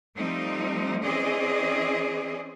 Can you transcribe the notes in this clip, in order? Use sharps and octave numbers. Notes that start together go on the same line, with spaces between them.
F3 G3 A3 C4 D#4
E3 C4 C#4 G#4 D5 D#5